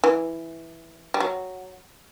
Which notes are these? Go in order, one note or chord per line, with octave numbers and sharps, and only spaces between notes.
E3
G3
F#3